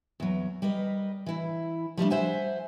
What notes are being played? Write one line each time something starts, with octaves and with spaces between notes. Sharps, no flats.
E2 F#3
G3 A#4 B4 D#5
E3 E4
F3 G3 A3 D4
C5 E5 F#5 G#5